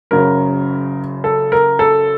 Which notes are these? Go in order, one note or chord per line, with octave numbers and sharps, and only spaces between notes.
F#1 F#2 C#3 F#3 A#4
A4
A#4
A4